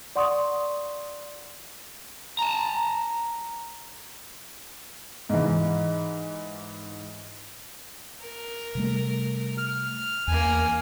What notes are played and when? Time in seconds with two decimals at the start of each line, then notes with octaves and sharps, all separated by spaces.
0.16 D5 F#5 C6 C#6 D#6
2.39 A5 A#5
5.29 G#2 E3
8.22 A#4
8.75 C3 G3 A3
9.58 F6
10.27 E2 A#3 G#5